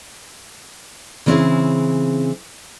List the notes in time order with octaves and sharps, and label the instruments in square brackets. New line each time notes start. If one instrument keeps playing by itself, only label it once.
[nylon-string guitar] C#3 E3 C4 C#4 E4 G#4